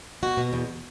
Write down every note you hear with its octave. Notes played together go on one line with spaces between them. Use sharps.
B2 F#4
B2
E2